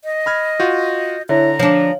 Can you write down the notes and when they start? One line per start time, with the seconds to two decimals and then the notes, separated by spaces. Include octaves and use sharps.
0.04 D#5
0.26 B5 F6 G#6
0.60 F4 F#4 G6
1.29 D3 E4 C#5 E5 A#5
1.59 F3 D4 C#5 F5